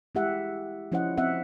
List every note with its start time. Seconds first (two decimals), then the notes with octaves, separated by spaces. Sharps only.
0.15 G#3 E4 G4 E5 F#5
0.92 F3 C#4 E4 C5 D#5 F#5
1.18 C4 E5 F#5